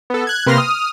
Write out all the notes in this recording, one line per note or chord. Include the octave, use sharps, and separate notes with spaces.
B3 A4
F#6 G#6
C3 A#3 B4 C6 F6 A#6
D#6 F6